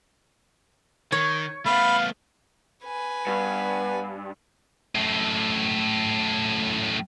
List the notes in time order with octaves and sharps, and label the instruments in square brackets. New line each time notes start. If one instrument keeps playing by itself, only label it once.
[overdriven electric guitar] D#3 [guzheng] C#5
[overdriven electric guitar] A3 B3 [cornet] F5 [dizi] B5
[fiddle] B4 G#5
[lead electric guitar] G2 [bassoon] B3
[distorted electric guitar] F#2 A2